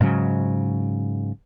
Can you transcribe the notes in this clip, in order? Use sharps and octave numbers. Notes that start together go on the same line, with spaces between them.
G#2 C#3 F#3